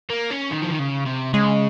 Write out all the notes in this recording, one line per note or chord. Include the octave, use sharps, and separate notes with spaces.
A#3
C#4
D#3
F3
D#3
C#3
C3
C#3 G#3